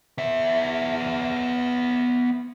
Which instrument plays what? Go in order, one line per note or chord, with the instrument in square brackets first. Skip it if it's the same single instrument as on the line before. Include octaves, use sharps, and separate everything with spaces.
[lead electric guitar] B3 E5